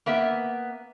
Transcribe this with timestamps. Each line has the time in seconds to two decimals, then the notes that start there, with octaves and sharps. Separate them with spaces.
0.06 A#3 B3 E5